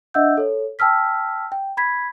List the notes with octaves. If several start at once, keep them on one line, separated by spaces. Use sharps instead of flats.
D4 D#5 E5 F#5 E6 G6
A4 C#5
G5 A5 E6 F6 B6
G5
B5 G#6 B6